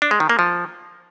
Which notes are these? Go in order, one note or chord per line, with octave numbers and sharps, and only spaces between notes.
D4
G#3
D#3
A#3
F3